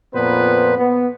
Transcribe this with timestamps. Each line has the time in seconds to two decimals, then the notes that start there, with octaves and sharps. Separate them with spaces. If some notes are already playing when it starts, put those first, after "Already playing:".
0.14 F2 A#2 B3 B4 C5
0.78 B3